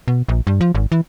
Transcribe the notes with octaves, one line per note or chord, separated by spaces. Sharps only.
B2
A#1
G2
F3
G#1
E3